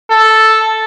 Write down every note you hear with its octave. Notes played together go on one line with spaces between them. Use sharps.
A4